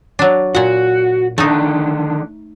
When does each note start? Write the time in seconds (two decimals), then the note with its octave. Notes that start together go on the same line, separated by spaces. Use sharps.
0.19 F#3 D4
0.55 A#2 F#4 F#5
1.38 D3 D#3 A3 D4 D#4